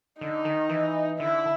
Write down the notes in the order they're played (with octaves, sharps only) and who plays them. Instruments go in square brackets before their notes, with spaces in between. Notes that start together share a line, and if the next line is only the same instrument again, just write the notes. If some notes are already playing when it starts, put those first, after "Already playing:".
[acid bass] D3 [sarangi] D#4
[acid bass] D#3
E3
[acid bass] D3 [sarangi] E4